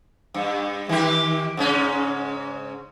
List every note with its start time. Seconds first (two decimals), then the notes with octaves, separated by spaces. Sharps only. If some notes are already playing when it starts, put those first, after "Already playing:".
0.34 G2
0.89 D#3 G4
1.57 G#2 C#3 C#4